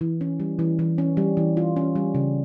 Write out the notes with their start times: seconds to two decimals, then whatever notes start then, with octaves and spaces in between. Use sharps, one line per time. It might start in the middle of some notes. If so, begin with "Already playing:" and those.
0.01 E3
0.21 C#4
0.40 G3
0.59 E3
0.79 E3
0.98 C#4
1.17 G3
1.37 E3
1.57 F4
1.76 C#4
1.96 G3
2.15 C#3